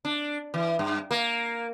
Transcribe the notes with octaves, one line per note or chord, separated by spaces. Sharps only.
D4
E3
G2
A#3